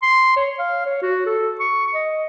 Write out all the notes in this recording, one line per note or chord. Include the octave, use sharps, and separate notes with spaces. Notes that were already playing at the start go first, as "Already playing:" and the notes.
C6
C#5
F5
C#5
F#4
A4
C#6
D#5